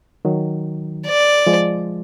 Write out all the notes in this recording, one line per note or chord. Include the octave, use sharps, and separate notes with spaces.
D#3 F#3
D5
F3 G#3